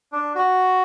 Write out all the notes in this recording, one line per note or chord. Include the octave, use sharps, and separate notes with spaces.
D4
F#4